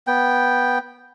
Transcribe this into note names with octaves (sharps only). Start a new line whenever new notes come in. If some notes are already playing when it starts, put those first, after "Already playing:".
B3 G5